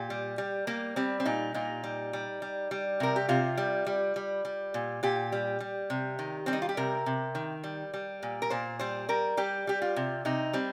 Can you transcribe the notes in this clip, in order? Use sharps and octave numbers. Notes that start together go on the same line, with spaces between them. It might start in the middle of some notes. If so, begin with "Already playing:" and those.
Already playing: A#2 G4
G3
G3
G3 A#3
G3 C4
C4
A#2 D#4
A#2 D#4
G3
G3
G3
G3
C3 A#4
G4
C3 F4
G3
G3
G3
G3
A#2
A#2 G4
G3
G3
C3
D#3
G3 C4
D#4
F4
G4
C3 A#4
C3
D#3
G3
G3
A#2
A#4
A#2 C5
G3 C5
G3 A#4
G3 G4
G3 G4
F4
C3
C3 D#4
G3 C4